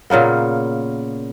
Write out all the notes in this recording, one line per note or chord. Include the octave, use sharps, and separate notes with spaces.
A#2 C#3 A#3 B3